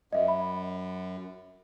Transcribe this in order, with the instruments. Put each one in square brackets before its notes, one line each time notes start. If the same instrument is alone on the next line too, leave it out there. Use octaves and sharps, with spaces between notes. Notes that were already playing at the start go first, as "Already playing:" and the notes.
[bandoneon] F#2 [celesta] D#5 E5
[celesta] B5